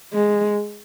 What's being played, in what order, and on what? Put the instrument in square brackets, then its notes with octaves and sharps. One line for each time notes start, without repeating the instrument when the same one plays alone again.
[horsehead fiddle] G#3